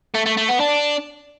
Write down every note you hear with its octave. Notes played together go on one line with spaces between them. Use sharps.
A3
A3
A3
B3
D4